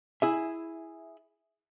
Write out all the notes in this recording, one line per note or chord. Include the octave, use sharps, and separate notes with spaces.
E4 G#4 E5